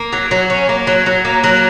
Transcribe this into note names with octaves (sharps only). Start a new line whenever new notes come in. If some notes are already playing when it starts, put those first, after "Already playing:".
Already playing: A#3
F#3
F#3
C#4
A#3
F#3
F#3
A#3
F#3